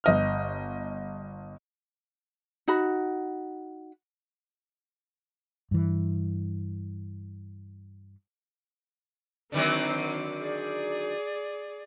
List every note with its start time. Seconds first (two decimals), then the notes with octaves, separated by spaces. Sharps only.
0.04 G1 D#5 F6
2.68 D#4 F#4 B5
5.71 G2 E3
9.52 D3 D#3 F#3 C4 C5
10.40 G#4 D5